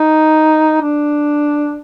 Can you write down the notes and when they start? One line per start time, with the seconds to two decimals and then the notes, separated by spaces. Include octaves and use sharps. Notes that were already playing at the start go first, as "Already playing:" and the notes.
Already playing: D#4
0.82 D4